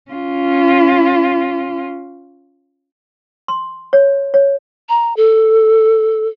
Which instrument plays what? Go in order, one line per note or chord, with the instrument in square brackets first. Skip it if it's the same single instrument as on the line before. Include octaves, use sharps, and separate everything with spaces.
[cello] C#4 F4
[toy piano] C6
C#5
C#5
[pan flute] A#5
A4